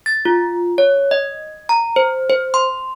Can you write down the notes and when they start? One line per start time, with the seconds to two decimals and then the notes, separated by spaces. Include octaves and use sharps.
0.06 A6
0.25 F4
0.78 C#5
1.11 D#5
1.69 A#5
1.96 C5
2.30 C5
2.54 C6